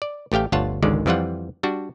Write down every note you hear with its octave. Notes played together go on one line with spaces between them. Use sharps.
D5
A1 A3 G4 F5 G5
G1 D2 F4 C#5 F#5 A5
G#1 C#2 D3 D#3 G#3 D5
F2 E3 F3 G3 F4 F#5
G3 D4 F#4